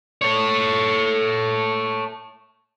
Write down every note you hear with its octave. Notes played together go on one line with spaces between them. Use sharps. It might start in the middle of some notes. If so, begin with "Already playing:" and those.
A4 C#5